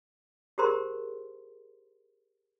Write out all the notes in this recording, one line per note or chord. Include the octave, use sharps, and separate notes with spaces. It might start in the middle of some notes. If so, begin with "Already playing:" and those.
G4 G#4 A#4 C5 A#5 C6